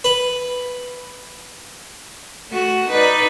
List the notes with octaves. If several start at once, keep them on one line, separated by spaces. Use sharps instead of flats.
B4
A3 F#4
D#4 B4 D5